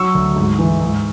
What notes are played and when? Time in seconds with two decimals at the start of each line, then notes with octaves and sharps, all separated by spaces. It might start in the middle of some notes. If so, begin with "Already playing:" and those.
Already playing: F#3 C#6 E6
0.15 D2
0.36 G#2
0.59 E3
0.81 G#2